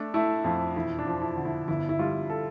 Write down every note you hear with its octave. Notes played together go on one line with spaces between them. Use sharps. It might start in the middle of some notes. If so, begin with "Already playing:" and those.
Already playing: A3 D4
A3 E4
F2 F4
E1 E4
D4
F3
E4
D3
E4
G1 E4
E4
G3 F4
A4